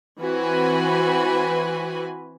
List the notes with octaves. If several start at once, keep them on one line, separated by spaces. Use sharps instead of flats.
E3 C4 F#4 B4 G#5 B5